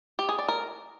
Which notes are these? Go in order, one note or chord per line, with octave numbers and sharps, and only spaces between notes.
G4
G#4
D5
A#4